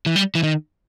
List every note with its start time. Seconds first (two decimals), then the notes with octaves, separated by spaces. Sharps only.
0.06 E3
0.16 G3
0.35 E3
0.43 D#3